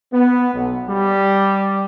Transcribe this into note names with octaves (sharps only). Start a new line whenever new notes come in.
B3
B1
G3